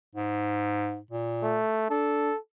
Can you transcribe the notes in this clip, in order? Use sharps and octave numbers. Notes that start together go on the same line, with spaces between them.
G#2
A#2
A3
D4 A4